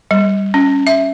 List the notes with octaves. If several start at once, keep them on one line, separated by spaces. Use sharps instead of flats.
G3
C#4
E5